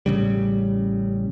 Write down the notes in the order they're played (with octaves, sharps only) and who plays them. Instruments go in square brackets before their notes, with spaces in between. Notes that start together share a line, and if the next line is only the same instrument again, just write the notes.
[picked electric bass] A1 C#3 G3